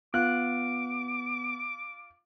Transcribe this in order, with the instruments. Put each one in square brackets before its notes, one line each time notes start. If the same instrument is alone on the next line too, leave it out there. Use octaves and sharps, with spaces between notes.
[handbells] B3 [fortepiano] F4 [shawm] D6 [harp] F#6